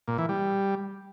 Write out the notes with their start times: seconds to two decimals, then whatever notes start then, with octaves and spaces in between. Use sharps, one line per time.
0.08 A#2
0.18 E3
0.29 G3